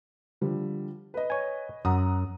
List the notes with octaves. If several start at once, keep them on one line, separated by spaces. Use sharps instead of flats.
D3 F3 G3
B4 D#5
C#5 G#5
F#2 F#5 A#5 D#6